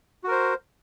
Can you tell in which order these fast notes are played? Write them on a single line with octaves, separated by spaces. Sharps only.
F#4 A#4 C5